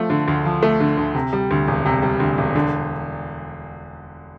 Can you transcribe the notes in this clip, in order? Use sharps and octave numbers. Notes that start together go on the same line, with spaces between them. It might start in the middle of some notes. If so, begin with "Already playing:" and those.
Already playing: F3 A3
D3
D2
F3
A3
D3
D2
C3
G3
D2
E1
C3
G3
D2
E1
D3